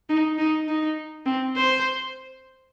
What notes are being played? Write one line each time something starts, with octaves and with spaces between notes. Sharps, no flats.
D#4
D#4
D#4
C4
C5